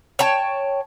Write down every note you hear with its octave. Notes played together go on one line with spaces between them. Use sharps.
C#5 G5 A5